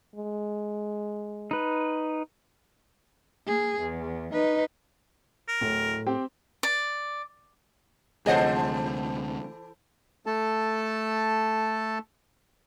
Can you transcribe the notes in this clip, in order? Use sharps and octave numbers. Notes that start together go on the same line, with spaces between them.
G#3
D#4 B4
A#3 G#4
E2
D#4 B4
A#4
D1 A2
C4 G4 G5
D5
D2 C3 E3 G#4 A4 C5 D#5 F#5
A3 A4 A5